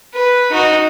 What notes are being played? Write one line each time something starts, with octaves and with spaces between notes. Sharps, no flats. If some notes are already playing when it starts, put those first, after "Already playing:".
B4
D#4 F#4